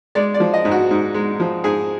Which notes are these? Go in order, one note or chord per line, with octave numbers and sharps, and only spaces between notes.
G#3 D5
D5
F3
D#5
G#2
F#4
G#2
G#3
F3
G#2 G#4